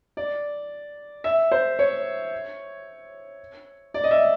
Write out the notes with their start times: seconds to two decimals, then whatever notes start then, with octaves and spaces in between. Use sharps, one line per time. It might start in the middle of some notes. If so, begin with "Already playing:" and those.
0.17 D5
1.24 E5
1.52 C5
1.79 C#5
3.94 D5
4.04 D#5
4.11 E5